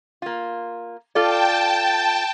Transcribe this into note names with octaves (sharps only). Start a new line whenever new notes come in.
A#3 F4
F4 A4 D5 G5 A5